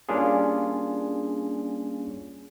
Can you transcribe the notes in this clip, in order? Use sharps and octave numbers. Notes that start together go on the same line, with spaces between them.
G3 A#3 C#4 D4 F4 G#4